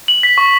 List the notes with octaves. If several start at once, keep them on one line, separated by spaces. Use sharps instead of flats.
F#7
B6
C#6